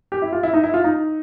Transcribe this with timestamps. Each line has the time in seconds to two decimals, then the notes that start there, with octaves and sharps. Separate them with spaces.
0.12 G4
0.22 E4
0.33 F4
0.43 E4
0.54 D#4
0.64 E4
0.74 F4
0.84 D#4